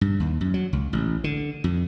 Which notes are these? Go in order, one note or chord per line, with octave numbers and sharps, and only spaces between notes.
G2
D#2
F#2
F#3
C#2
A1
D3
F2